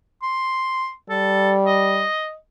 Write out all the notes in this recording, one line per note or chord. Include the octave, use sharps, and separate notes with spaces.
C6
G3 A4
D#5